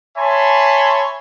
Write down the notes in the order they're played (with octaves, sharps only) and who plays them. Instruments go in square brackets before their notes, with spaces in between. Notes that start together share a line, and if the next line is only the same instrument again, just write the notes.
[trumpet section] C#5 E5 G#5 A5 B5 C6